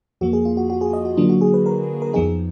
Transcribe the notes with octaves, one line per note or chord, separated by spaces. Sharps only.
F2 F3 A#3 F#4
G#4
F4
F#4
F#4
G#4
D#5
F#4
D3 F#3 A#3 D4 F4
F#4
G#4
B4
A#4
A#4
F2 F3 B3 D#4 G#4